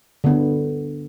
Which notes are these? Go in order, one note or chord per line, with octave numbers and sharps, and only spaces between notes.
D3 B3